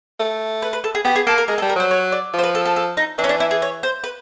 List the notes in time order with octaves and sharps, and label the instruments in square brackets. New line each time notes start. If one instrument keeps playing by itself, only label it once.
[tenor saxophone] A3
[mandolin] B4
B4
A4
G#4
[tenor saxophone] B3 [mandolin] G4
[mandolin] G#4
[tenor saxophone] A#3 [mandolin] A4
[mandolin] A#4
[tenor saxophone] G#3 [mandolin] A#4
[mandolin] A4
[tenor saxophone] G3
[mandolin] A#4
[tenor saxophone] F#3 [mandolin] C5
[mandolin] C#5
D5
[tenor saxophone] F3 [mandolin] C5
[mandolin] B4
A4
A4
A4
D#4
[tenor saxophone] E3 [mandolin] D4
[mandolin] C#4
D4
E4
G#4
C#5
C5
B4